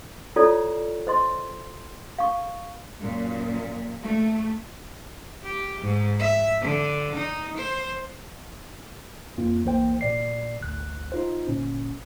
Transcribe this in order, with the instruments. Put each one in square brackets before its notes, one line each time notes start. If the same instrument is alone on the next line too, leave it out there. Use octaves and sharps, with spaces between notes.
[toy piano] E4 F4 A4 C#5 D5
C5 D#5 C6
F5 C#6
[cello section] F#2 A#2
A3
[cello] G4
G#2
E5
D3
D#4
C5
[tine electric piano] F2 A#3 C4 F4
B1 E3 A#3 C5 G5
A#2 D5 C7
G#1 D2 F#6
D#4 F4 C5
G1 A#2 C#4